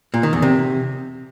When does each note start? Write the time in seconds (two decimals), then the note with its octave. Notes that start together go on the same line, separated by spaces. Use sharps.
0.14 A#2
0.23 D#3
0.33 E2
0.42 C3